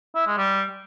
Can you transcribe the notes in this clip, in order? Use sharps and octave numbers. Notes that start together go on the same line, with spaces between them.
E4
G#3
G3